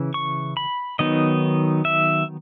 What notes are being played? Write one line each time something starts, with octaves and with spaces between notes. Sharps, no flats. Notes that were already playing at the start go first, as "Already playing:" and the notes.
Already playing: C#3 E3
C#6
B5
D#3 F#3 B3 D#4 D#5
E5